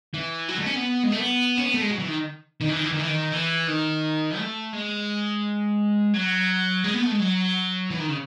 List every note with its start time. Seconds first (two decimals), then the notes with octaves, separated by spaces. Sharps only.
0.14 E3
0.49 F#3
0.58 A3
0.66 C#4
0.76 B3
1.03 G#3
1.12 A3
1.20 B3
1.58 C#4
1.65 B3
1.74 A3
1.82 G#3
1.90 F#3
1.99 E3
2.08 D#3
2.61 D#3
2.69 E3
2.76 D#3
2.84 E3
2.92 D#3
2.99 E3
3.07 D#3
3.32 E3
3.67 D#3
4.37 A3
4.73 G#3
6.14 F#3
6.84 G#3
6.94 B3
7.02 A3
7.11 G#3
7.20 F#3
7.90 E3
7.99 D#3
8.09 C#3